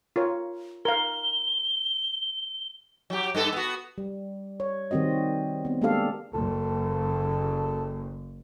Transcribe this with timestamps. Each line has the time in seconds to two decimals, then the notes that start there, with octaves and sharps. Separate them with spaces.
0.16 F4 A#4 C#5
0.85 A#4 F5 G7
3.10 F#3 G4
3.35 G2 B3 A4
3.52 B3 F#4
3.98 G3
4.60 C#5
4.91 D#3 G3 C4 F#4 D#5
5.65 B3 C4
5.82 G#3 A#3 D4 G4 A4 F5
6.34 F#1 A4